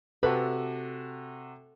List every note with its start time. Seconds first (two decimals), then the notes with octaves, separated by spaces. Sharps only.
0.23 C3 F#4 A4 B4